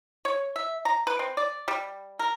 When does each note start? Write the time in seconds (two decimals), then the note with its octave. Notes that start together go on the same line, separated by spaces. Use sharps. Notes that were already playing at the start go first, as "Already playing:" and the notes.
0.25 C#5
0.56 E5
0.85 A#5
1.07 B4
1.19 C4
1.37 D5
1.68 G3
2.19 A#4